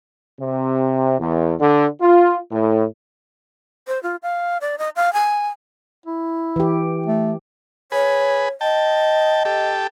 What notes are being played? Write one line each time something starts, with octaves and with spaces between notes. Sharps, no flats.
C3
E2
D3
F4
A2
C5
F4
F5
D5
D#5
F5
G#5
E4
E3 G4
A3
G#4 B4 C#5
D#5 G5 A5
G4 A4